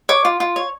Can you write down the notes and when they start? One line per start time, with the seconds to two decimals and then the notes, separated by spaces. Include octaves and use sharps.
0.09 C#5 D6
0.25 F4
0.40 F4
0.56 C#5